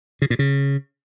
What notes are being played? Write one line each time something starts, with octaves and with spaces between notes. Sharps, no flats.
C#3
A#2
C#3